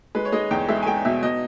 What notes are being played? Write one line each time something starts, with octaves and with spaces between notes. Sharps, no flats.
G#3 B4
C#5
G#3 D#5
E2 G5
G#3 E5
G#5
G#3 G5
B2 E5
B2 D#5